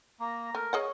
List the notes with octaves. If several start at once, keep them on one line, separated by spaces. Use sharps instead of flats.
A#3 A#5
A3 A#4
G#4 C#5 D#5 F#5